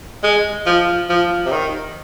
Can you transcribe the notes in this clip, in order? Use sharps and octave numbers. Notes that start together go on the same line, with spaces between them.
G#3
F3
F3
C3
D#3